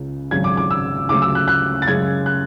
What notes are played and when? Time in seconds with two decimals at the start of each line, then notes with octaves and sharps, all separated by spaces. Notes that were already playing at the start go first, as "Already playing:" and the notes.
Already playing: C#2 C#3
0.31 G#1 F#2 C#3 F#3 G#6
0.44 D6
0.57 D6
0.71 E6
1.09 D2 C#3 F#3 A3 D6
1.22 E6
1.35 F#6
1.48 F#6
1.82 A6
1.87 F#2 C#3 G#3 G#6
2.26 F#6